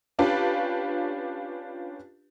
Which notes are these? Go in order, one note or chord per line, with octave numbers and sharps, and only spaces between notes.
C#4 D4 F4 G4 B4